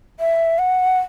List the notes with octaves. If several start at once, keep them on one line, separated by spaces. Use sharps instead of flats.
E5
F#5